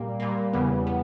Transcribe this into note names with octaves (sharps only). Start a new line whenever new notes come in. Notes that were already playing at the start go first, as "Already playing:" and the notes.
Already playing: A#2 G3 A#3
A#2 G3 A#3
E2 C#3 G3 B3
G3 B3